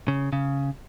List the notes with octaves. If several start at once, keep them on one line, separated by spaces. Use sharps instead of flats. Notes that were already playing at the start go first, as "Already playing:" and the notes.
C#3
C#3